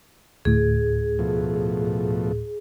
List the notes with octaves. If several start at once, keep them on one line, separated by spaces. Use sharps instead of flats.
D2 A2 G#4
B2 F3 A3